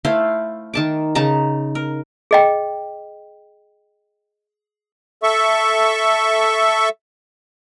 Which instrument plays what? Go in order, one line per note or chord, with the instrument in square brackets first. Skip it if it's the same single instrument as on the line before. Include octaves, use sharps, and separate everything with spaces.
[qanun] A3 E4 C5 F5
D#3 A5 D6
C#3 D#4 A5 A#5
A#4
[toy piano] G#4 D#5 G5
[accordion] A4 E5 C#6